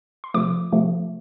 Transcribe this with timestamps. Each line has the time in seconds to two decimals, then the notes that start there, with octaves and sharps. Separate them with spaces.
0.24 C6
0.34 C3 F3 A3 D6
0.73 C3 F3 A3